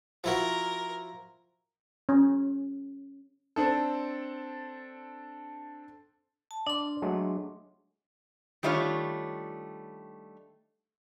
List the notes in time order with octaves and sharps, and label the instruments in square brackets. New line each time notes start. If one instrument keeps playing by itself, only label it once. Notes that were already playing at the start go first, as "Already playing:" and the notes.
[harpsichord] F3 E4 F#4 [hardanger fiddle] A#4
[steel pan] C#4
[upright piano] C4 D4 A4
[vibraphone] A5
[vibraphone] D4 C6 [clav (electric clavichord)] D5
[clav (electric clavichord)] F#3 G#3 A3
[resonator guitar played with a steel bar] D#3 G3 A3 D4 F4 C#5